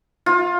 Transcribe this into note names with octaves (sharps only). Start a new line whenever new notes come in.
F4